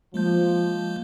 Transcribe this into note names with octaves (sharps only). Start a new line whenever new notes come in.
F3 G#3 A#3 G6